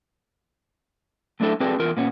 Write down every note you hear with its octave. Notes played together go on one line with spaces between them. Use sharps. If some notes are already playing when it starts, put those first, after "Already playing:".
F#3 A3 D4 E4 A4
C4 F#4 G#4 A4 B4 D5
E2 F4 A#4
A#2 B3 C#4